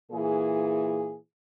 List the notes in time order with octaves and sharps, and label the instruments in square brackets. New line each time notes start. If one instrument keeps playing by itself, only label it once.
[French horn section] A#2 E3 G#4